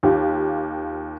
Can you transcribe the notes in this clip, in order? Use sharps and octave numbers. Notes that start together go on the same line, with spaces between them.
D#2 F4 G4